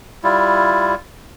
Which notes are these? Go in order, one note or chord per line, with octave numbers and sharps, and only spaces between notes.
G3 E4 F4